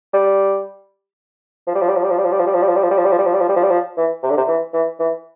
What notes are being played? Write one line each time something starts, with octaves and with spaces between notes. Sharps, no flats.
G3
F3
G3
F3
G3
F3
G3
F3
G3
F3
G3
F3
G3
F3
G3
F3
G3
F3
G3
F3
G3
F3
G3
F3
G3
F3
G3
F3
G3
F3
E3
C3
D3
C3
E3
E3
E3